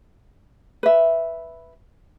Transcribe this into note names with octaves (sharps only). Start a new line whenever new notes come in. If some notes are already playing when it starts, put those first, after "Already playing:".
B4 E5